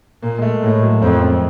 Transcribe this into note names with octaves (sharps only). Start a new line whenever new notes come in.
A#2 A#3
G#3
A3
A2 G#3
F#3
F2 C4
C4